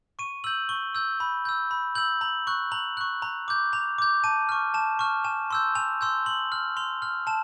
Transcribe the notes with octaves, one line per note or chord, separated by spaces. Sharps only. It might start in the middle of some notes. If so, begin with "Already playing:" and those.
C#6 D#7
E6 G6 F#7
C#6 G7
E6 G6
B5
E6 G6
B5
E6 G6 F#7
A#5 F#7
C#6 F#6
A#5 F#7
C#6 F#6
A#5
D6 G6
A#5 F7
D6 G6
A5 D#7
C#6 F6
A5 E7
C#6 F6
G#5 E7
C6 E6 G6
G#5 F7
C6 E6 G6
C6 F#7
F6
C6 F7
F6
A5 E7